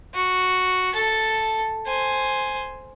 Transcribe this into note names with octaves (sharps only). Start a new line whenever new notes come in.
F#4
A4 A5
C5 G#5